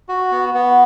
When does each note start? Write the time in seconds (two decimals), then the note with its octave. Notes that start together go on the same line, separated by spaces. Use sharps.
0.09 F#4
0.31 B3
0.54 B3